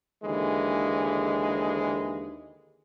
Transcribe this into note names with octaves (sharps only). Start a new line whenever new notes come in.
D#2 D3 E3 G#3